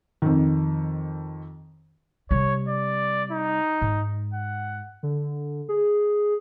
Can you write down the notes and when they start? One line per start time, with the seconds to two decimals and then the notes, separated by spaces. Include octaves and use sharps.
0.22 F2 D#3
2.31 C3 G3 C#5
2.68 D5
3.31 D#4
3.82 G#2
4.33 F#5
5.03 D3
5.69 G#4